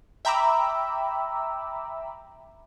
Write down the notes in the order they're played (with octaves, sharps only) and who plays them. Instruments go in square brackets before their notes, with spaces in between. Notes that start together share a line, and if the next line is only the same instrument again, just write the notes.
[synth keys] E5 G5 A#5 B5 D6 E6